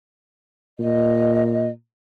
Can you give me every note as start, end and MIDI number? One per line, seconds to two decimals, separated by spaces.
0.80 1.68 46
0.80 1.69 75